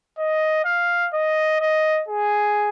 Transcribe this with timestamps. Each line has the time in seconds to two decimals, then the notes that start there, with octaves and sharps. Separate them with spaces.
0.18 D#5
0.65 F5
1.13 D#5
1.60 D#5
2.08 G#4